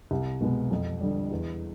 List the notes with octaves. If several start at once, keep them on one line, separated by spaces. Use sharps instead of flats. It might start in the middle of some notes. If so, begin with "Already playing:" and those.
C2
B2 G#3 B3
F2
D3 G3
E2